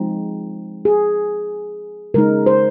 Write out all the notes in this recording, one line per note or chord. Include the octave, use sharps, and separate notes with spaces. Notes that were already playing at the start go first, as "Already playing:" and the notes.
Already playing: F3 G#3 C4 D#4
G#4
C#3 G#3 D#4 A#4
C5